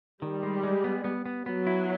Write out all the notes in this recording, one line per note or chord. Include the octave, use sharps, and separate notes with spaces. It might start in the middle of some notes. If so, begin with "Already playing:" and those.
D#3 G3
G#3
G#3
B3
B3
B3
F#3 B3
E4